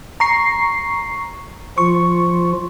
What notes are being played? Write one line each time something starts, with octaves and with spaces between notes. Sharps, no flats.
A#5 C#6 C7
F3 F4 C#6